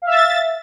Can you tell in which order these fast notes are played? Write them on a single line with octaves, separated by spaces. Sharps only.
F5 E5 A6